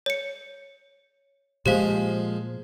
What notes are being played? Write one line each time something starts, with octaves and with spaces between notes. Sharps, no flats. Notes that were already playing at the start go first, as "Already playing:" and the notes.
C#5 C#7
A#2 F3 G#3 A#3 G4 C5 F5